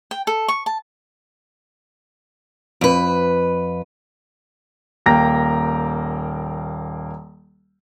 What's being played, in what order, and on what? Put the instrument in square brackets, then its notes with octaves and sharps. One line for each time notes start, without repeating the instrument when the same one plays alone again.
[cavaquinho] G5
A4
C#6
A5
[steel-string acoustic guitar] F2 B4
[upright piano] D#1 A#3 G5 A#5 A#6